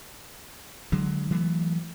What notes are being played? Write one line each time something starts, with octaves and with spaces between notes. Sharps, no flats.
D3 F#3 G#3
E3 F#3 A3